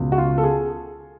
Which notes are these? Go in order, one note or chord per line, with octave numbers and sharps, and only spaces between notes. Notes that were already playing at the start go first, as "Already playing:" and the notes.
Already playing: C#2 B2
F#4
F4
A4
G#4